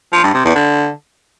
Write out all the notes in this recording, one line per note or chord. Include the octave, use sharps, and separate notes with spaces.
F3
G2
C3
E2
D3